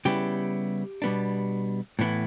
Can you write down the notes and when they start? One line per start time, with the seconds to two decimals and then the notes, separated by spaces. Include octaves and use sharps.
0.05 C#3 G3 B3 E4 G4
1.02 B2 G3 B3 D4
1.99 A2 E3 B3 E4